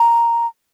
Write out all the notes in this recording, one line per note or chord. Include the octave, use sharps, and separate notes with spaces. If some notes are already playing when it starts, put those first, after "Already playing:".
Already playing: A#5